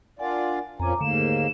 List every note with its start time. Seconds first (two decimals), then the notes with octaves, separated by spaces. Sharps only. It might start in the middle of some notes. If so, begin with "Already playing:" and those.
0.19 D4 F4 A#4 D5 F#5 G#5
0.80 F2 A#2 F3 C#4 G#5 A#5 D6
1.01 D#2 G#2 D3 A3 A#3 E7